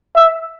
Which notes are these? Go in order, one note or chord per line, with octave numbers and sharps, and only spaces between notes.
E5